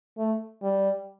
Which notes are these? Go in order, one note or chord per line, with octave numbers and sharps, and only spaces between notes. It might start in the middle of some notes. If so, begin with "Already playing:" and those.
A3
G3